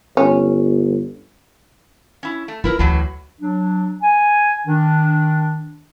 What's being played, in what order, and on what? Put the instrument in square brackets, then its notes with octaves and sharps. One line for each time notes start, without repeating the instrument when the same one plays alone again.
[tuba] G1 [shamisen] C#4
[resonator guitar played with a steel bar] C#4 E4
A3
[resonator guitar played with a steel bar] E4 A#4 B4 [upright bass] F4
[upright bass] D2 [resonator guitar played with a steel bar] A2 E3 F#3
[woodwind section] F#3 D4
G#5
D#3 D4